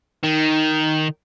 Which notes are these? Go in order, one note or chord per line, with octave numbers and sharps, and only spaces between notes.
D#3